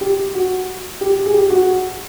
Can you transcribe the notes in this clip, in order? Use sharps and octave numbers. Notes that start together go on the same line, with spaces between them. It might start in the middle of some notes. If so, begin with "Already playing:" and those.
G4
F#4
G4
G#4
G4
F#4